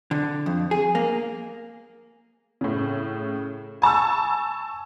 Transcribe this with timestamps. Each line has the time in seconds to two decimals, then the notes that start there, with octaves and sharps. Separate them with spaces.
0.11 D3
0.46 F2
0.71 G#4
0.95 A#3
2.61 A2 C#3
3.82 G#5 A5 C#6 E6